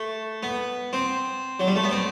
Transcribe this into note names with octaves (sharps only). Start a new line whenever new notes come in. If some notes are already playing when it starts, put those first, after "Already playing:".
Already playing: A3
B3
C4
F#3
G3
A3
B3
C4